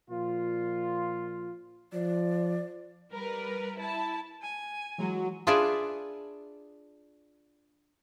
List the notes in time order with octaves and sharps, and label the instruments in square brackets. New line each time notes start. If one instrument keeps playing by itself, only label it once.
[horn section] A#2 F3 F4
[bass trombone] F3 [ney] D5
[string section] G3 A#4 B4
E4 A5
[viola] G#5
[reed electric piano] E3 G#3 [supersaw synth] F#3
[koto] D4 F4 G#4 B4 D5 E5